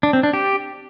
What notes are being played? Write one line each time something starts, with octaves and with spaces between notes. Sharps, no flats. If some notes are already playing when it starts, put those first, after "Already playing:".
D4
C4
D4
G4